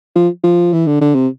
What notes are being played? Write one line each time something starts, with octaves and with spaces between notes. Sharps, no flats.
F3
F3
E3
D3
D3
C3